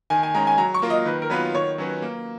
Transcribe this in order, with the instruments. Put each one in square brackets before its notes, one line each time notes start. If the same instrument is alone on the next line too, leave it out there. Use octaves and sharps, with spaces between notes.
[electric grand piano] D#3 [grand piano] G#5
[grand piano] G#5
[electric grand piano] G#3 C#4 [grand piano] A#5
[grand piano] G#5
[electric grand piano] F#3 [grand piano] A#5
[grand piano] C#6
[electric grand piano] A#3 F4 A#4
[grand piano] D#5
[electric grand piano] D#3 [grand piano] B4
[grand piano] A#4
[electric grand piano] F#3 B3 F4 [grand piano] B4
[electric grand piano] D#3 [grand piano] C#5
[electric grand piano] F#3 C#4 F#4 B4
A#3